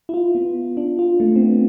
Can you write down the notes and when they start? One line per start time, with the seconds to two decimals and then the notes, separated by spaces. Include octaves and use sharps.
0.09 E4
0.14 F4
0.35 B3
0.77 D4
0.99 F4
1.20 A3
1.36 C4
1.41 B3